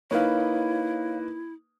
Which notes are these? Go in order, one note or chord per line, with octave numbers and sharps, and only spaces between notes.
A#3 D#4 E4 B4 C#5 F5